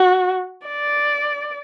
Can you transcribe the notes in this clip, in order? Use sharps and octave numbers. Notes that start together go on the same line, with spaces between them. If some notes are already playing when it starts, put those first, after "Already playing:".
Already playing: F#4
D5